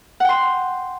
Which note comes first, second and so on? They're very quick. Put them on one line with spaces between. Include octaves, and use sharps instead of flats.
F#5 G5 C6